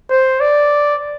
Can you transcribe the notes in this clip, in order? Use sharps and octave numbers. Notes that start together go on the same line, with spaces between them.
C5
D5